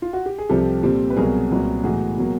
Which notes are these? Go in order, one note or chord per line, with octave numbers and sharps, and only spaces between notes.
F4
F#4
G4
G#4
C2 C3 F3 G4 A4
A#2 G3 C4
B4
C2 B2 F#3 A#3 G#4 A#4
C2 A#2 F#3 B3
A2 E3 G#3 B3 F#4 G#4
B2 F#3 A#3